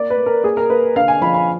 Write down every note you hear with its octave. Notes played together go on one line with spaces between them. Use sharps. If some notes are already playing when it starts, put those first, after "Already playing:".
Already playing: A#3 D5
B4
A#3
A#4
A#3 G#4
A#4
A#3 B4
D3 F5
G#5
F3 B5
B5